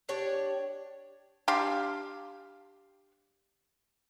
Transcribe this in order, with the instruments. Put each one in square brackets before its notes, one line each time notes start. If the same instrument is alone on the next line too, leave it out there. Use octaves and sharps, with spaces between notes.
[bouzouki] D4 G4 C#5
[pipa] D4 G4 F5 C6